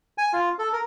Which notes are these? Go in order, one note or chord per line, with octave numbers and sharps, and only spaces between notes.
G#5
F4
A4
A#4